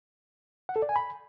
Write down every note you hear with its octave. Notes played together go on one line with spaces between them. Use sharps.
F#5
A4
D5
G#5
B5